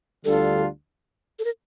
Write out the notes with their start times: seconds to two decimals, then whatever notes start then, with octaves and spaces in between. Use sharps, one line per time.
0.25 D2 D3 G3 D4 F4 A4
1.39 A4
1.45 A#4